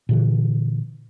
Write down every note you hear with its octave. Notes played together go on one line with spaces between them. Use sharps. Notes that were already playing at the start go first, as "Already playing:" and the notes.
A#2 D3 E3